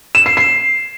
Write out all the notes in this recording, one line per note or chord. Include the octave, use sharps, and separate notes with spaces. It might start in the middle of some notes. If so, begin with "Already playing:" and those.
E7
C7
C7